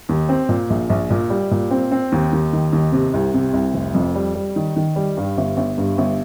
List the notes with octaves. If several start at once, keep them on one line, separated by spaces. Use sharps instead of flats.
D#2
C4
A#2
A#1
A#1
A#2
G3
A#2
C4
C4
D#2
D#2
D#3
D#2
C3
C2
C3
C2
F1
F2
G3
G3
D#3
D#3
G3
G2
G1
G1
G2
G1